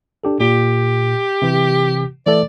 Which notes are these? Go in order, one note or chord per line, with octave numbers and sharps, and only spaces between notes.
D4 G4 A4
A#2 G4
C3 E3
E3 A3 A4 D5